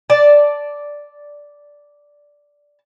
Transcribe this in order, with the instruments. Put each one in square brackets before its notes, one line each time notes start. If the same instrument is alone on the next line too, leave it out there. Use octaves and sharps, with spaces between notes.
[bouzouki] D5 A5